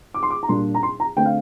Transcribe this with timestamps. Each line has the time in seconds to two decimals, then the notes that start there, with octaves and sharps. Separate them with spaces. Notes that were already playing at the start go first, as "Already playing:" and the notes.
0.14 D6
0.23 C6
0.30 D6
0.43 A#5
0.48 A#2 G3 A#3 D4 C6
0.75 A#5
0.83 C6
1.00 A#5
1.16 D3 A3 C4 G5
1.26 F5